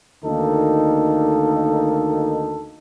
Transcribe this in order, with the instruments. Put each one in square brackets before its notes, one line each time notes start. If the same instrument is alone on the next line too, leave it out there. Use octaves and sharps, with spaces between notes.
[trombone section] D2 D#3 A#3 D#4 A4